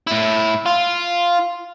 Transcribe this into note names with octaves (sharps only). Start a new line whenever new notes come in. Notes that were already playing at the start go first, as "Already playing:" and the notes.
A2 E4
F4